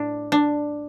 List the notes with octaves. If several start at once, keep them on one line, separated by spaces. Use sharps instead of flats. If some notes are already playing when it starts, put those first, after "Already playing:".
Already playing: A2 D4
D4